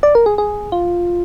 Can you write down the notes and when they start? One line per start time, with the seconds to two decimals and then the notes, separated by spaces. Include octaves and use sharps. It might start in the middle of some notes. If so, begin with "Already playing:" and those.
0.03 D5
0.15 A#4
0.26 G#4
0.38 G#4
0.72 F4